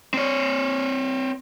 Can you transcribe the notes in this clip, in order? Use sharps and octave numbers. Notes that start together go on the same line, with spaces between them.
C4 C#5